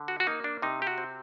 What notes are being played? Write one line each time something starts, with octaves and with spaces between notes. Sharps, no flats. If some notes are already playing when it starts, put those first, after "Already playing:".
Already playing: D3
F#4
F#4
A#3 D#4
D4
C3 D#4
G4
F#4
C4